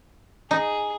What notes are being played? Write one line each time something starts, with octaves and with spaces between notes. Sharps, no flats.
D#4 G#4